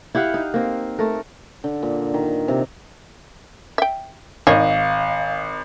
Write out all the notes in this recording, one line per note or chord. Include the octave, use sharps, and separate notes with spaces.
E4 G4 F5 F#5
D#4
A#3 C4
A3 A#4
D3
A#2
D#3
C3
E5 G5
G#1 D#3 C#5 D#5 F5